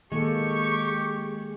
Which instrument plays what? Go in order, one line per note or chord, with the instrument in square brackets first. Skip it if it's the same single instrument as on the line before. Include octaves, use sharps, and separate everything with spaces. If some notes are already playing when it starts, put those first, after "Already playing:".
[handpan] D#3 A#3 A4 [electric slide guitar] G#3 [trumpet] G4 [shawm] C#6